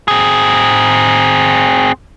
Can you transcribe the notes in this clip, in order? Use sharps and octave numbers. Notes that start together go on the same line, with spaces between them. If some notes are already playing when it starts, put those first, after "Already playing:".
C4 G#4